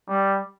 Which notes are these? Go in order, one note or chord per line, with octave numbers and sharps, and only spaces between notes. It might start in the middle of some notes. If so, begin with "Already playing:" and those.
G3